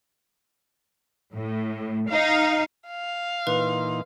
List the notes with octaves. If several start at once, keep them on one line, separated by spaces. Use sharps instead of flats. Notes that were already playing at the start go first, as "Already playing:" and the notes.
A2
D#4 F5
F5
A#2 E3 D#4 B4 C6